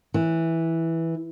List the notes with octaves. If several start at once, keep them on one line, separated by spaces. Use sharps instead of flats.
E3